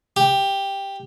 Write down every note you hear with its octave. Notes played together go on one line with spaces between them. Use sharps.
G4